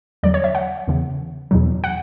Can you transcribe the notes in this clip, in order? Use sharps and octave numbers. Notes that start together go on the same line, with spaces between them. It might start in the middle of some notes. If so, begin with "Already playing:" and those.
E2 D3 F#3 D5
C#5
E5
F#5
E2 C#3 E3
E2 B2 F#3
F#5